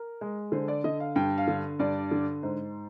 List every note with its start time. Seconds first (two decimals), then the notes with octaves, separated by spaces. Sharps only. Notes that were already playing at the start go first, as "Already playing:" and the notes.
Already playing: A#4
0.21 G#3
0.52 D3 C5
0.68 D5
0.84 D3 D#5
1.00 F5
1.16 G2 G5
1.38 F5
1.48 D3
1.79 G2 D5
2.11 D3
2.43 G#2 C5